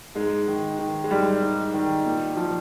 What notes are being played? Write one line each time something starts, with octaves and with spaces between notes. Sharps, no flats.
G#2 G#3
D#3
D#3
G#3
G#2 G3
G#2
D#3
A#2
F3